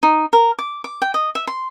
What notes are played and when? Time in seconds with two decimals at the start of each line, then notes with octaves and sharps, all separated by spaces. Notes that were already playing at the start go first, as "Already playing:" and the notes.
0.03 D#4
0.33 A#4
0.59 D6
0.84 D6
1.02 G5
1.14 D#5
1.35 E5
1.47 C6